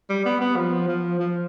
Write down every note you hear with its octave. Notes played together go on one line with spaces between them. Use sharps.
G3
B3
B3
F3
F3
F3